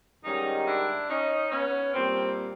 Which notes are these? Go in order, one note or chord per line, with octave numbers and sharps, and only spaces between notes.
G#2 D#3 G3 C#4 D#4
D4 E4
C#4 D#4
B3 C#4
A#2 G3 C4